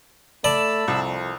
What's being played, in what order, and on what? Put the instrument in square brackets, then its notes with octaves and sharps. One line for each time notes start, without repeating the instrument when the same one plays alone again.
[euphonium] A3 [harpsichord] D5 [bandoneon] A5 B5 E6
[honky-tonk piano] C2 [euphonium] F2